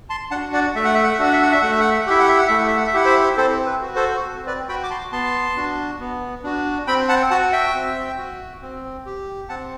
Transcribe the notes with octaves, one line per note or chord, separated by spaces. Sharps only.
A5 C6
D4 F#4 F#5 A5
D5 F#5
A3 E5
F#5
E5
F#5
E5
D4 F#4 F#5
E5
F#5
E5
A3 F#5
E5
F#5
E5
F#5
E4 G4 E5
F#5
E5
F#5
A3 E5
F#5
E5
F#5
E5
E4 G4 F#5
C5 E5
C4 A4 C5
B4
F#4
A4 C5
C4
B4 D5
F#4 G5 B5
D6
A5 C6
B3 A5 C6
D4 F#4
B3
D4 F#4
C4 G5 B5
F#5 A5
F#4 F#5 A5
E5 G5
C4
F#4
C4
G4
C4 F#5 A5